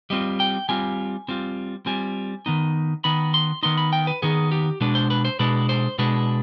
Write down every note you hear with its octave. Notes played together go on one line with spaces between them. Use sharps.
G3 C4 F4 D#5
G5
G3 C4 F4 G#5
G3 C4 F4
G3 C4 F4 G#5
D#3 B3 D#4
D#3 B3 D#4 B5
C6
D#3 B3 D#4 C6
B5
G5
B4
D#3 B3 D#4 G#4
G4
B2 G#3 D4 B4
C5
B4
C5
B2 G#3 D4 B4
C5
B2 G#3 D4 B4